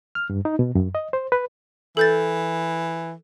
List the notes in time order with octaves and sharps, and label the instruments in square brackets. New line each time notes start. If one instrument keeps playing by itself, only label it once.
[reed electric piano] F6
G2
D#4
B2
F#2
D#5
C5
B4
[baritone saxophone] E3 [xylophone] A4 G6 A6